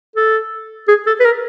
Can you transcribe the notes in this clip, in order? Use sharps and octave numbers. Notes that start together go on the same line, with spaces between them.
A4
G#4
A4
B4
A#4